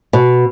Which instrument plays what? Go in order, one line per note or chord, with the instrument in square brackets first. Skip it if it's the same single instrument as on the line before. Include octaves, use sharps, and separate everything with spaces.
[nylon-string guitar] B2